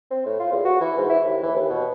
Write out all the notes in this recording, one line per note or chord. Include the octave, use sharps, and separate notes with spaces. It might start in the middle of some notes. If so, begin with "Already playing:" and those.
C4
A2
F4
E2
F#4
E3
G#2
E4
D#2
E3
D#2
B2